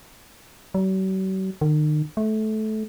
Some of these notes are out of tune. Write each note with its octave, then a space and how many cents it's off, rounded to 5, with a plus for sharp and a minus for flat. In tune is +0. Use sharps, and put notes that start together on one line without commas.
F#3 +45
D#3 -40
A3 -20